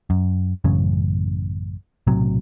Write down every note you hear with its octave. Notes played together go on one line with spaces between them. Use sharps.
F#2
A1 F#2 C#3 C#4
B1 A2 C3 F#3